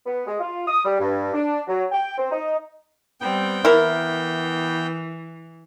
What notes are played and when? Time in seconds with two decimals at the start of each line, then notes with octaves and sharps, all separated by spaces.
0.06 B3
0.27 G#3
0.40 F4
0.68 D#6
0.85 G3
1.00 G2
1.34 D4
1.68 F#3
1.92 G5
2.17 C4
2.31 D#4
3.21 G3 B3 C4 G5
3.65 E3 E4 A#4